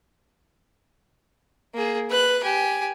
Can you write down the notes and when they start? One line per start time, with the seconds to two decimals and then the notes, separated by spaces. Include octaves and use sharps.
1.74 A#3 G#4
2.10 B4 F#6
2.44 G4 G#5